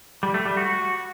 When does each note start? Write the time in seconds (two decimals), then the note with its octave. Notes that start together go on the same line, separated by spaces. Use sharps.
0.23 G3
0.34 A3
0.46 G3
0.57 F#4